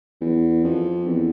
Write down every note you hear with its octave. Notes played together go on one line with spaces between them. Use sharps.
E2
F2
E2